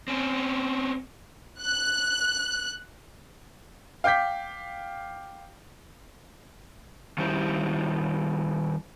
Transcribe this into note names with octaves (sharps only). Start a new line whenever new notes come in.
C4 C#4
F#6
F5 G5 D6 G6 B6
D#3 G3 C#4 E4 G4 C5